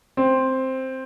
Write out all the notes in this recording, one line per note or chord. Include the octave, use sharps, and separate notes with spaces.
C4